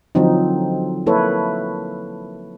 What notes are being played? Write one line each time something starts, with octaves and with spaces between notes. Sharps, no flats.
D3 F3 F#3 C4 D#4
A#3 E4 A4 B4 C#5